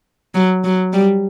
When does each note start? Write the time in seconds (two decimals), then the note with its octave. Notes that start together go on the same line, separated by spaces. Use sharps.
0.35 F#3
0.64 F#3
0.93 G3